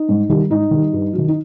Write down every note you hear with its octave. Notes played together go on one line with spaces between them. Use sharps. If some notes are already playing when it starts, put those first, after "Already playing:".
Already playing: D#4
G#2
D#3 G3
G#2 D#4
D#3 G3
G2
D#3 F#3
D#4